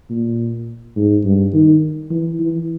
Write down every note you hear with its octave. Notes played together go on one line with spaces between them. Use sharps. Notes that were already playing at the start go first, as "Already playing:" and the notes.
A#2
G#2
G2
D#3
E3
E3